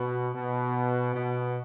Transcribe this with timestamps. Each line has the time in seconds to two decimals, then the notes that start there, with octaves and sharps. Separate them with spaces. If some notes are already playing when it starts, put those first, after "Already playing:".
Already playing: B2
0.34 B2
1.15 B2